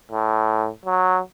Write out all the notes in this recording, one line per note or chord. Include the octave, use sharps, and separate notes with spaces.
A2
F#3